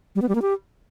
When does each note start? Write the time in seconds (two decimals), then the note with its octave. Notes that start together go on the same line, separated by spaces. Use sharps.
0.15 G3
0.22 B3
0.29 G3
0.35 A#3
0.42 G4